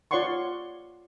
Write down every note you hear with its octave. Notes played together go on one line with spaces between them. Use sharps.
F4 C#5 D5 F#5 C6 C#6